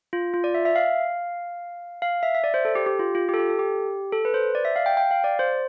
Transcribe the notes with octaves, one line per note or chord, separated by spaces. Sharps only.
F4
F4
D5
E5
E5
F5
F5
E5
E5
D5
C5
A4
G4
G4
F4
F4
G4
A4
G4
A4
G4
A4
B4
C5
D5
E5
F5
G5
G5
F5
D5
C5